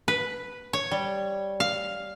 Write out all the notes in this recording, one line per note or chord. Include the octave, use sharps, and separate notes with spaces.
B4
C#5
G3
F5